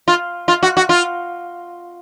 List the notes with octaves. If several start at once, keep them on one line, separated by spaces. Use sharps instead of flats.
F4
F4
F#4
F#4
F4